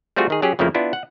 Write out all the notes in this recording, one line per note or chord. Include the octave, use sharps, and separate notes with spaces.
G3 A3 C4 F4 F#4 G#4
D#3 G#4
F#3 C#4 G4 G#4
F2 C#3 F3 A3 A#3 E4
B3 D4 E4 F4
F#5